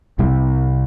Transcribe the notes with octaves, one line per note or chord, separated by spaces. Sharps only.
C2 C3 G3